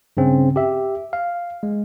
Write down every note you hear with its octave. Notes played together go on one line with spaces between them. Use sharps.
G2 C#3 C4 C#4
G4 E5
F5
G#3